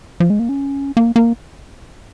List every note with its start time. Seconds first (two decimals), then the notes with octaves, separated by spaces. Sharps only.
0.20 F3
0.30 G#3
0.39 A#3
0.49 C#4
0.97 A#3
1.16 A#3